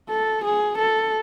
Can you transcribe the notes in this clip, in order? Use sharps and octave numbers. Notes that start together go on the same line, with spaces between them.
A4
G#4
A4